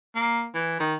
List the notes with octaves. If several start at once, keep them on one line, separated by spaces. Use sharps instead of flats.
A#3
E3
D#3